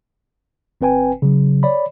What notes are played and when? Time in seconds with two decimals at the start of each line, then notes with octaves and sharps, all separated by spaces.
0.81 G1 C4 B4 G5 G#5
1.22 C#3 F#3
1.63 C#5 D5 B5